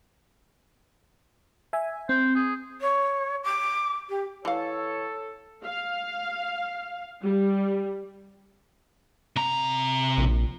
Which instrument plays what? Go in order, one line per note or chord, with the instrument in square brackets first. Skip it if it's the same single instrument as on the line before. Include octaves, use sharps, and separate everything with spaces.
[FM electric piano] E5 G#5
[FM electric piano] C4 [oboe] C5
[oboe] G#4
[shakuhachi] C#5
D6
G4
[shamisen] E3 F5 [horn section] A4 [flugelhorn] C#5
[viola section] F5
G3
[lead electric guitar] C3 A#5
[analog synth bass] A#1